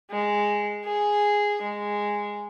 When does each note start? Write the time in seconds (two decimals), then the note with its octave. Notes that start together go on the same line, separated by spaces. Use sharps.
0.10 G#3
0.85 G#4
1.62 G#3